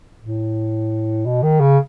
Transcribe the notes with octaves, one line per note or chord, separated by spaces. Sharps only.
A2
B2
D#3
C#3